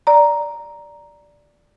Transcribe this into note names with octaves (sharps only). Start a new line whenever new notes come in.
D5 A#5